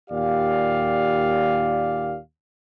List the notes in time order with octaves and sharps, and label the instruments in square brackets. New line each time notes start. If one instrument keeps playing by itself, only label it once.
[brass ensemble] D#2 A#2 G4 D5 F5